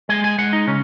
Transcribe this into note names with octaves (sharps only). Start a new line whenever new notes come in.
G#3 G#5
G#5
G#3 F#5
D#4
C#3 C#4